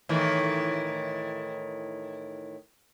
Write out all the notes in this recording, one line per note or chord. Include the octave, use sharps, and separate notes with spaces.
A2 D#3 E3